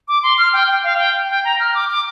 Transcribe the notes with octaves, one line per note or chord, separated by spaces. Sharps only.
D6
C6
F6
G5
G5
F5
G5
G5
A#5
F6
D6
D6